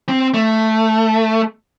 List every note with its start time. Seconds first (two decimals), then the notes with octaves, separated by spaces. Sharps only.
0.09 C4
0.34 A3